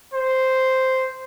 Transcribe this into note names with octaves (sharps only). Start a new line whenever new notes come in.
C5